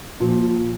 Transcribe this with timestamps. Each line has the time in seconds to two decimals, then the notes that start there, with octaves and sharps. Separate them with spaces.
0.20 A#2 F3